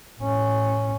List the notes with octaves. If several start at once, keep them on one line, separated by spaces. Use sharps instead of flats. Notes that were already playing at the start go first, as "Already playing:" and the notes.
A2 C#4